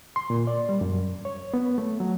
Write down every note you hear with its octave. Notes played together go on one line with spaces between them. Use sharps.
C6
A#2
D5
G3
F#2
C#5
B3
A3
F#3